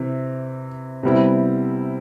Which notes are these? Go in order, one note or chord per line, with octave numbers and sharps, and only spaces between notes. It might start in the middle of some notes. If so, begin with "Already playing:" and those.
Already playing: C3 E3
C3 G3 B3 E4